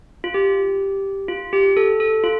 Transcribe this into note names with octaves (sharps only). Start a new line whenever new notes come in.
F4
G4
F4
G4
A4
A4
F4